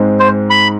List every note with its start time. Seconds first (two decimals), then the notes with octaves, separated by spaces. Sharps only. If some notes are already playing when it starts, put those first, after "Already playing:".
Already playing: G#2 G#3 C4
0.19 C5
0.50 B5